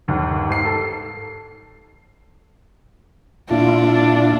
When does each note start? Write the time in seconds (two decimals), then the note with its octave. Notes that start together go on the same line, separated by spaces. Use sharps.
0.08 G1 D#2
0.50 G#2 C7
0.65 A4
3.51 A#2 D4 E4 F4